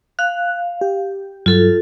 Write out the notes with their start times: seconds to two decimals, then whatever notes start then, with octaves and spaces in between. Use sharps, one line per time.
0.19 F5 F#6
0.81 G4
1.46 G2 F#3 F4 A4